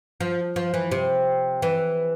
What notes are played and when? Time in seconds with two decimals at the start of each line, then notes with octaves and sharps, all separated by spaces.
0.20 F3
0.56 F3
0.74 E3
0.91 C3
1.62 E3